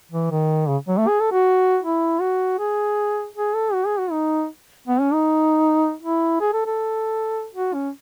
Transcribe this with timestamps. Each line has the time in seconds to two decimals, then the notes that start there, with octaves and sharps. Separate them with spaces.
0.12 E3
0.31 D#3
0.68 C#3
0.88 F#3
0.97 A3
1.07 G#4
1.20 A4
1.32 F#4
1.83 E4
2.21 F#4
2.59 G#4
3.35 G#4
3.54 A4
3.73 F#4
3.86 G#4
3.99 F#4
4.11 D#4
4.88 B3
5.00 C#4
5.13 D#4
6.02 E4
6.40 G#4
6.53 A4
6.66 A4
7.54 F#4
7.74 C#4